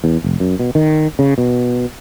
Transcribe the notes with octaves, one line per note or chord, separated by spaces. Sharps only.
E2
F1
F#2
B2
D#3
C#3
B2